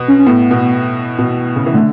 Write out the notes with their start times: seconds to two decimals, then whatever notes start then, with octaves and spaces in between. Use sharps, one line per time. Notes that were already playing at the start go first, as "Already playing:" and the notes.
Already playing: B2
0.08 C#4
0.19 C#4
0.27 A2 B3
0.51 B2
1.19 B2
1.56 C#3
1.66 E3
1.74 D3 A3